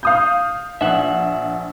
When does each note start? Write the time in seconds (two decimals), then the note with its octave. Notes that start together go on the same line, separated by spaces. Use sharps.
0.03 F5 D#6 G6
0.81 A#1 E5 F#5